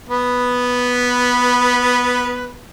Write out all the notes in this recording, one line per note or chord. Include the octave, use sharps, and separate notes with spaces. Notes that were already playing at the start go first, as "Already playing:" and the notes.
B3 B4